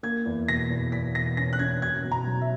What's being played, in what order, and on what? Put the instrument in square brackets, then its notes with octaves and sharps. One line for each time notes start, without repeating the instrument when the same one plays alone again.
[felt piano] A#3 G#6
E2
B2 A#6
E2
E2 B6
B2 A#6
C#4 A#6
F#6
C#4 G#6
B2 G#6
B2
A#5
F#3
E5